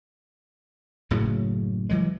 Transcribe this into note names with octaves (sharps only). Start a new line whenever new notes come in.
F#1 A2 C#3 F#3
E3 F#3 G#3